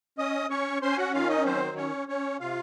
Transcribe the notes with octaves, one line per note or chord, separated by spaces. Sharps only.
C#4 D#5 D#6
C#4 C#5 C#6
C#4 C5 C6
G#5
F#4 F#5
D#3 F4 F5
D#4 D#5
F#3 C4 C5
C#4 C#5
C#4 C#5
C3 F4 F5